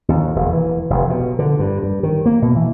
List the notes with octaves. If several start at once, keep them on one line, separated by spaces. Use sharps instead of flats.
D#2
E1
E3
F1
B2
D3
G2
G2
D#3
A#3
B2
E3